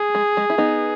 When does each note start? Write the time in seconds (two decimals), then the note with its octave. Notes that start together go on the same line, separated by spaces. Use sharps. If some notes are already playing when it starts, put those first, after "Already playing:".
Already playing: G#4
0.15 G#3
0.37 G#3
0.50 E4
0.58 B3 D#4